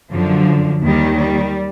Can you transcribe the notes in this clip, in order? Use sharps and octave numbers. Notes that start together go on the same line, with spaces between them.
F#2 D3 F3
D#2 D#3 G3
G3